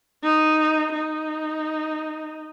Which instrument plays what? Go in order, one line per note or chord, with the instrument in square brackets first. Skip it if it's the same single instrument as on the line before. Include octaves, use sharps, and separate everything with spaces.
[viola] D#4
D#4